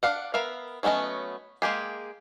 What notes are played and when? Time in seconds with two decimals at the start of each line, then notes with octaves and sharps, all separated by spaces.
0.03 D4 D5 F5 F#5
0.34 B3 A#4 E5 F5
0.83 F#3 A3 B3 C#4 D#5
1.62 G#3 A#3 G4 G#4